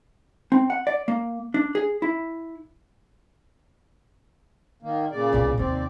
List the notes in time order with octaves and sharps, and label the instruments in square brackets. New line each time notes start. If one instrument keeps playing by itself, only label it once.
[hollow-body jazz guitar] C4
F#5
D5
A#3
D4
G#4
E4
[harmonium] D#3 A#3
A#2 C#3 D5
[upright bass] C2 B2
[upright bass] D#2 C3 [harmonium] C4 D5